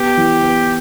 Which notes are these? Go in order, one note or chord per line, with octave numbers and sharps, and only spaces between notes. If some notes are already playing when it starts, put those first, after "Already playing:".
Already playing: B3 G4
E3
B3